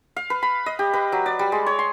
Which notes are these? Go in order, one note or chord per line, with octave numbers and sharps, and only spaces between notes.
F5
B4
B5
D#5
G4
B4
F#3
D5
G3
G#3
C#5
C6